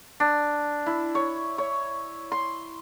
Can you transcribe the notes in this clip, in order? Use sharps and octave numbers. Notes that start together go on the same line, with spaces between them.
D4
E4
C#5
C#5
C6